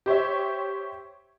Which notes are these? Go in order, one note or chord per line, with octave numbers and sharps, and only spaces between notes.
G4 C5 C#5 E5